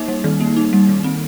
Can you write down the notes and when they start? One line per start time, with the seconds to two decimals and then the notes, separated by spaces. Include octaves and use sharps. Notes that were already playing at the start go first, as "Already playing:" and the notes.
Already playing: A#3 D#4
0.08 G3
0.24 D#3
0.40 A#3
0.56 D#4
0.73 G3
0.89 D#3
1.04 C4